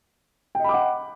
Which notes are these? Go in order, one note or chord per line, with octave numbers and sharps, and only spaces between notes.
D#5 F#5 G5 B5 D6